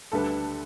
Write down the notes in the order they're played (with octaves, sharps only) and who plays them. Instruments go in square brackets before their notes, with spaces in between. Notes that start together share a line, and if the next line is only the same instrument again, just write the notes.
[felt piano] D2 D3 G3 D4 B4 [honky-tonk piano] A4